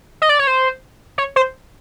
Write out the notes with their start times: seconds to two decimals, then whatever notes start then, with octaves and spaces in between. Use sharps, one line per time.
0.22 D#5
0.29 D5
0.39 C#5
0.47 C5
1.18 C#5
1.36 C5